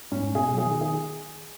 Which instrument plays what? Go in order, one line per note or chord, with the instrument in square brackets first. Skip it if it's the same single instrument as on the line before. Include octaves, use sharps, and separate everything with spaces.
[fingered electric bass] G#2 [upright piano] C#4
[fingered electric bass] B2 [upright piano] G#4
[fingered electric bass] F#3 [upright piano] G#4
[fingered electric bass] D#3
[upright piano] G#4